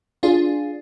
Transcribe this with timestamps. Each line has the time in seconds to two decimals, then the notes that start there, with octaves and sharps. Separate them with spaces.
0.23 D4 F4 G#4